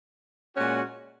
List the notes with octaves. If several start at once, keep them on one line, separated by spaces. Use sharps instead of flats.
A#2 G#3 C#4 F#4